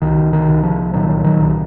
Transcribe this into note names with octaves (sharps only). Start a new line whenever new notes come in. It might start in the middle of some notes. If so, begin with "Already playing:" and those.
C2 D#3
D#3
C2
F3
A#2 D#3 F#3
D#3 F#3
C2